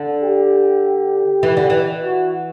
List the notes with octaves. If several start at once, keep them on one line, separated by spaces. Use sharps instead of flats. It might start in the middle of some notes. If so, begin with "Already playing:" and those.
Already playing: D3
G4
E3
D3
E3
F#4